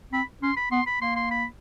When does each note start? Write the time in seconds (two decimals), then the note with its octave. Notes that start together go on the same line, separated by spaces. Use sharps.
0.12 C4 B5
0.42 C#4 C6
0.57 B5
0.71 B3 C6
0.86 B5
1.02 A#3 C6
1.16 C6
1.31 B5